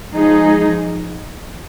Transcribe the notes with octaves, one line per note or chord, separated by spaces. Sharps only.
F3 G#3 D#4 G#4